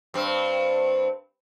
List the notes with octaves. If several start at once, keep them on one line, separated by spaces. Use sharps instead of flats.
G2 C4